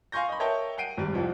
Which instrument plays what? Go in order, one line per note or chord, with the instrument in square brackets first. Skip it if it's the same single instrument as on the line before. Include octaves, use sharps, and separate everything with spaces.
[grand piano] F5 G#5 C6 C#6 G6 A#6
D#5 B5
A#4 C#5 D#5 E5 G5 A5
F#5 G5 C7 D7 D#7
G#1 G3
C2 F2 F3